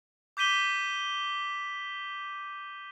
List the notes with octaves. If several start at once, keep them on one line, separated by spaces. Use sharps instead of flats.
D6 G6 B6 D#7 G7